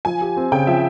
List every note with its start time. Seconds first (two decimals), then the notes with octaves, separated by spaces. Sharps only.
0.05 F3 G#5
0.21 G4
0.37 C4
0.52 C#3 G5
0.67 F3 E5